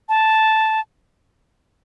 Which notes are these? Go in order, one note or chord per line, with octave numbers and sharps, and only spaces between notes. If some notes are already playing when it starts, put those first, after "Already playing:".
A5